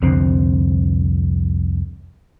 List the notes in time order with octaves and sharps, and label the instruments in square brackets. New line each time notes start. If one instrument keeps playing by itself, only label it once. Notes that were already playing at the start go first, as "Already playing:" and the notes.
[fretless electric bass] C2 F2 D3 C4